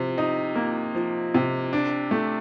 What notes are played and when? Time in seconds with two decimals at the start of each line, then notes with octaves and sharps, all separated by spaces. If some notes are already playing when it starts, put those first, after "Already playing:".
Already playing: C3 F3
0.18 D#4
0.55 A#3
0.95 F3
1.34 C3
1.73 D4
2.11 A3